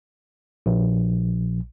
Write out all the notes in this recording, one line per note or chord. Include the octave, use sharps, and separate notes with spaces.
A#1